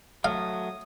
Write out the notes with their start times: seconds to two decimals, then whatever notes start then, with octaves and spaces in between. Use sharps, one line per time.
0.24 F#3 A3 F5 D#6